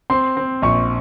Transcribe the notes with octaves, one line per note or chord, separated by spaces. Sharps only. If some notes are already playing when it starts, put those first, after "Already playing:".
C4 C6
C4
A#1 C#6